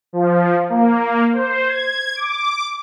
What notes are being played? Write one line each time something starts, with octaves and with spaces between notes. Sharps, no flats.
F3
A#3
C5
G#6
D6